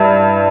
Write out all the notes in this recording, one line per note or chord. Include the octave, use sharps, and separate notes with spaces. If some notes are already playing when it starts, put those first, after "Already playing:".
Already playing: G2 E4